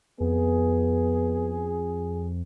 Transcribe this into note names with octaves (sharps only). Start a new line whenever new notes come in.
F2 B3 G#4